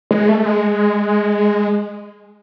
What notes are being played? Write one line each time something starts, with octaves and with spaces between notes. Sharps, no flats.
G#3
A3
G#3